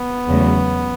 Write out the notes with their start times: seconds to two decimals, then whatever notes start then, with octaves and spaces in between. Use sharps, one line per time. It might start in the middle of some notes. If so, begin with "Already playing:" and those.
Already playing: B3
0.28 E2 C#3 F#3 A3